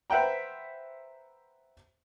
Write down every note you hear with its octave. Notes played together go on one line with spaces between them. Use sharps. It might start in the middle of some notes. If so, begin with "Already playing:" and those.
B4 C5 E5 F#5 G5 A#5